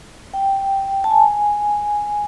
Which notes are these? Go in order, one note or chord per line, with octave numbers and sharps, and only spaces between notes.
G5
A5
G#5